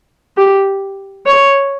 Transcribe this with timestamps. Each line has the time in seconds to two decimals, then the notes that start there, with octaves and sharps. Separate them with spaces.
0.37 G4
1.26 C#5